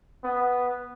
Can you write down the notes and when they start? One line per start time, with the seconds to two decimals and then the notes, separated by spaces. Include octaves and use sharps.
0.24 B3